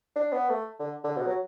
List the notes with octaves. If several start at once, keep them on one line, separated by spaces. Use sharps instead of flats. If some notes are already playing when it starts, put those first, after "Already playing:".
D4
B3
A3
D3
D3
B2
F#3